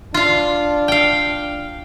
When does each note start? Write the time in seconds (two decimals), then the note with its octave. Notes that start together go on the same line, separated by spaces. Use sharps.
0.14 D4 F4 F5
0.88 F5 G5